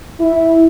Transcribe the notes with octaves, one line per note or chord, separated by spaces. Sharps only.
E4